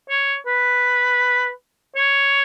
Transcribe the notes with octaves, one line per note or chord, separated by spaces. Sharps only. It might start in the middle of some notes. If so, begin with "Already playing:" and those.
C#5
B4
C#5